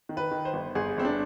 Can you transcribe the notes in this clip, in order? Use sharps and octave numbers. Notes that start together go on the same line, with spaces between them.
D#3
B4
D#3
C5
G1
G1 G#4
G1 C4
D4